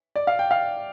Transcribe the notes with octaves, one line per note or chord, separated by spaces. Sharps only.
D5
F5
G5
F5